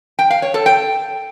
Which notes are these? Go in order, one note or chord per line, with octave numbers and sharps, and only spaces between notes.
G5
F5
C#5
A4
G5